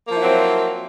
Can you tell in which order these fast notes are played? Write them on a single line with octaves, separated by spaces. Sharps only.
A#3 F3 E4 F#3 C4